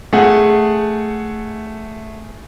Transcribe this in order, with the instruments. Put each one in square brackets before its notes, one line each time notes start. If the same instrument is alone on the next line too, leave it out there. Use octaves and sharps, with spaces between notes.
[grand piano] A3 G#4 F#5